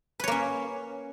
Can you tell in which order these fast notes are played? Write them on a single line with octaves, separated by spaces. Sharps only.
B4 C#5 A#3 C#4